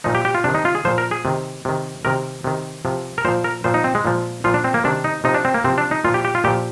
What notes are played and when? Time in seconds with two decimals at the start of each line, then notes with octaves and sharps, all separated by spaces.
0.04 A#2 F3 D#4
0.15 G4
0.25 G4
0.35 F4
0.44 C3 D#3 D4
0.55 D#4
0.65 F4
0.75 G#4
0.85 A#2 F3 C5
0.98 A#4
1.11 G#4
1.25 C3 D#3
1.65 C3 D#3
2.05 C3 D#3 A#4
2.44 C3 D#3
2.85 C3 F3
3.18 A#4
3.25 A#2 F3 C5
3.44 A#4
3.64 A#2 F3 C5
3.74 D#4
3.84 C4
3.95 G#3
4.05 A#2 F3
4.44 A#2 F3 F4
4.54 D4
4.64 C4
4.74 A#3
4.84 C3 D#3 D4
5.04 D#4
5.24 C3 F3 D#4
5.34 D4
5.45 C4
5.54 A#3
5.64 C3 F3 C4
5.78 D4
5.91 D#4
6.04 A#2 F3 F4
6.14 G4
6.25 G4
6.35 F4
6.44 A#2 F3 G4